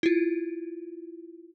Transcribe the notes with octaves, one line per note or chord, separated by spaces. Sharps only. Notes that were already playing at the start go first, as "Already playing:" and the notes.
E4 F4